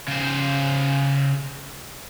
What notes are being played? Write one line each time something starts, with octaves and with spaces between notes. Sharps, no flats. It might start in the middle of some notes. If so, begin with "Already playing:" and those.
C#3 C5